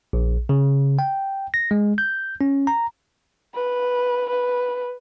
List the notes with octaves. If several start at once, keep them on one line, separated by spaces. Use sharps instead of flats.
A#1
C#3
G5
A#6
G#3
G6
C#4
A#5
B4
B4